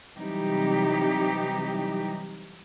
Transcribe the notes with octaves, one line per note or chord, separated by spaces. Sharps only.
C3 E3 F#3 G3 D#4 G4